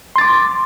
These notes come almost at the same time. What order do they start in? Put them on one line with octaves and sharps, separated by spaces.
C6 A6 D6